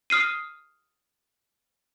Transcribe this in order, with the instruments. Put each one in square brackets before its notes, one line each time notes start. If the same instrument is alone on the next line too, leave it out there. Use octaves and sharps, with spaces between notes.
[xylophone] D#6 F6 C7 D#7